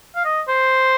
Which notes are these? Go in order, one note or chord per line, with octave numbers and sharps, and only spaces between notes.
F5
D#5
C5